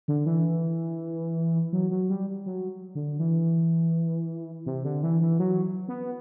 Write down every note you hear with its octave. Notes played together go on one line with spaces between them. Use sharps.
D3
E3
F#3
F#3
G3
F#3
D3
E3
C3
D3
E3
E3
F#3
B3